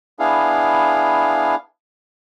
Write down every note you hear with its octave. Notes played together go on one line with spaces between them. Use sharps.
B3 D4 E4 G#4 F5